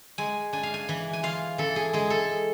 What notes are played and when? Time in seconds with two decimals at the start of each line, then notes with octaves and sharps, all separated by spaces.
0.18 G#3 G#5
0.53 D4 G#5
0.63 F5
0.74 G#5
0.89 E3
1.13 G#5
1.23 F4 F5
1.58 E3 A4
1.76 G#4
1.93 G#3 G#4
2.10 A4